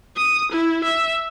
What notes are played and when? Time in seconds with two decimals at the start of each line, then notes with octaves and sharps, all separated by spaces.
0.17 D#6
0.52 E4
0.84 E5